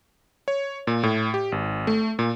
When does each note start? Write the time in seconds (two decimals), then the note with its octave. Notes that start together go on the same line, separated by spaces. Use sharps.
0.48 C#5
0.87 A#2
1.03 A2
1.34 G4
1.52 G#1
1.87 A3
2.19 A#2